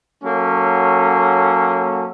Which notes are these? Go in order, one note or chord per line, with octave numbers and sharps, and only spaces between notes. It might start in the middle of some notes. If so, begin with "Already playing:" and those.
F#3 A#3 C#4 A4